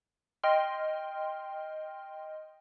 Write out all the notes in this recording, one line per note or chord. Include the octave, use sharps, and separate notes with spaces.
D#5 G5 C6 F6